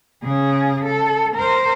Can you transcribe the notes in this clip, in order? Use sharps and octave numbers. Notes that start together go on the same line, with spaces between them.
C#3 G#4
A4
A#4 C5